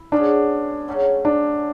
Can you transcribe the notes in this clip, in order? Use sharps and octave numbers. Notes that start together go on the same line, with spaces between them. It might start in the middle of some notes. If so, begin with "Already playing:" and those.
Already playing: E4
B2 G#3 C#4 D4 G#4
C#3 F#3 A3 C#4
D4